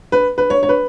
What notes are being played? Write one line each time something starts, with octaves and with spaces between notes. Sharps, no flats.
B4
B4
C#5
C#5
B4